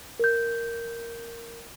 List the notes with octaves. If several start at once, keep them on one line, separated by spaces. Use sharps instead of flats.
A#4 G6